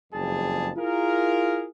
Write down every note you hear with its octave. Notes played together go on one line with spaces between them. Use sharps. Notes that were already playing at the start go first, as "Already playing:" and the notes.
F#1 F2 G3 G#4 A5
E4 F4 G#4 A#4